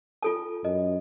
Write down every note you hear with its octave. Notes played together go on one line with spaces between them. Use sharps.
F4 A4 A5
F#2 D#5